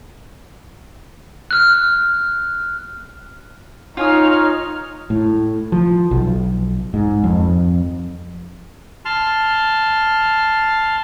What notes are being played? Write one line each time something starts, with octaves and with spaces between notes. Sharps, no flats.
F6 F#6
D#4 F4 C#5 G#5 D#6 F6
A2
F3
B1
G#2
F2
A5 C6 F6